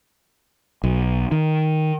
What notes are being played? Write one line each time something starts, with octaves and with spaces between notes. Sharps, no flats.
B1
D#3